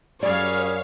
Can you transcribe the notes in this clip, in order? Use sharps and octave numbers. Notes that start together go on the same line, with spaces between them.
F#2 G3 G#4 C#5 D5 F5